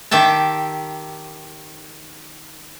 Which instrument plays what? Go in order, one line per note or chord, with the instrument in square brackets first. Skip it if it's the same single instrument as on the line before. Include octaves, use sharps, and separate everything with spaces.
[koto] D#3 G4 E5 G5 A5